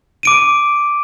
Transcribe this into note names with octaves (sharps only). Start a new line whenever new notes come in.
D6 D7 D#7